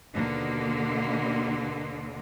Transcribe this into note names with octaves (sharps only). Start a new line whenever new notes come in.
D#2 B2 D3 A#3